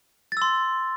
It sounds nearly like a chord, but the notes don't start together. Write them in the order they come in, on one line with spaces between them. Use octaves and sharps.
A6 E6 C6